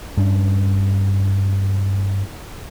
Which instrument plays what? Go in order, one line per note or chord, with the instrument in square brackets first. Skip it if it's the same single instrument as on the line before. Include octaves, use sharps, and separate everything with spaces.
[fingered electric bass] G2 G3 C#4 D4